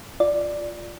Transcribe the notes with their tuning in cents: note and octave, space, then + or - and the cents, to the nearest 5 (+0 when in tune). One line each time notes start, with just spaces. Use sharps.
F4 +0 D5 +0